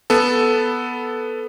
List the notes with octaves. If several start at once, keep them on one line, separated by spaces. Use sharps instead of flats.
B3 A4